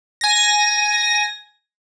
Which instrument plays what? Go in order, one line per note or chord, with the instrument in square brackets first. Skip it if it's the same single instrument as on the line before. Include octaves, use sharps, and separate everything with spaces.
[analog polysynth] G#5 A#6